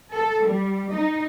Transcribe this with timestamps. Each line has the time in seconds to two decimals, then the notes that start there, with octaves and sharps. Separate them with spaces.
0.12 A4
0.43 G3
0.89 D#4